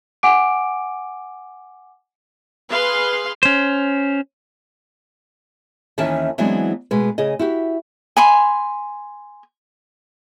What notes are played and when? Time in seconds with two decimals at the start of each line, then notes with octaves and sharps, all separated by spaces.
0.23 F#5 G#5 D6 D7
2.70 G#4 B4 F5 C6
3.43 C#4 C5
5.98 D#2 D#3 E3 C#4 E5 A5
6.38 E3 F#3 G#3 B3 C4 D4
6.91 B2 G#3 B4
7.18 C#3 G#4 D#5
7.39 E4 F#4 G4
8.17 G#5 B5 C6